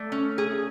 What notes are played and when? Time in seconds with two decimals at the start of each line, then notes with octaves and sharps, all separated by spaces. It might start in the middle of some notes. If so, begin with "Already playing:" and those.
Already playing: A3 D5
0.12 C#4
0.38 G#4